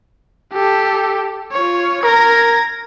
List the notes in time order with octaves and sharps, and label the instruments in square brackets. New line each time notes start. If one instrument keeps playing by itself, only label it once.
[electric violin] G4 A4
F4 C#5
[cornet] A#4 [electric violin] G#6 A#6